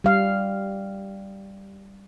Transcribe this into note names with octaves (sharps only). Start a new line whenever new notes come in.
G3 F5